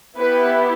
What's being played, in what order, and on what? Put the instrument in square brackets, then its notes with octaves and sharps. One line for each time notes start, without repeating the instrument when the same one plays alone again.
[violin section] B3 E4 G4 B4